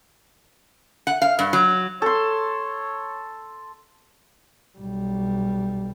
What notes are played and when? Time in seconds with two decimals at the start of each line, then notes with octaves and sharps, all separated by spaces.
1.07 F#5
1.22 F5
1.39 G2
1.53 F#3
2.02 A4 C#5 C6
4.79 B1 G3